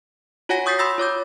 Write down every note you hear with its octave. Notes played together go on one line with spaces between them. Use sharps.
F4 F#4 C#5 F#5 G#5 A#6
C#6 D#6 G6 A6 B6 C7
B5 C6 D#6 E6 A6 A#6
F4 C#5 D6 G6